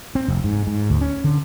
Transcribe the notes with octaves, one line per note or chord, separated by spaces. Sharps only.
C4
F1
G#2
G#2
D2
C#4
D3